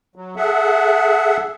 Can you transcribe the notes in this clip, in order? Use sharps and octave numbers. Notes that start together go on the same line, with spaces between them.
F#3
G#4 A4 E5 F#5